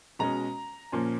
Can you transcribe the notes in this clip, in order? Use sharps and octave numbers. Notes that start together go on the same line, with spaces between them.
B2 G#3 C#4 A#5
A#2 F3 A#3 C#4